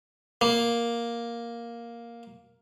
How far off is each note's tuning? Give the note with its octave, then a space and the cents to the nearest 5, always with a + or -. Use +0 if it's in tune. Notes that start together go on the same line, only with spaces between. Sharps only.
A#3 +5